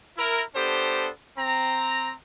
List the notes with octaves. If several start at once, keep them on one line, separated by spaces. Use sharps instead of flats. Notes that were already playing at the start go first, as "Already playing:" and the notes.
E4 A#4
B3 D4 G4 A4 C5
C4 A#5